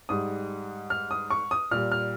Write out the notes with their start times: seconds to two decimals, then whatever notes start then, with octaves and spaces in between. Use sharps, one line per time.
0.09 G#2 G3 D#6
0.90 F6
1.11 D#6
1.31 C#6
1.51 D#6
1.71 A#2 G3 F6
1.92 F6